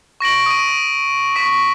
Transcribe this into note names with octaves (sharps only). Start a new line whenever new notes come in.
C#6 A#6 D7 F#7
D#6 D#7
C#6 B6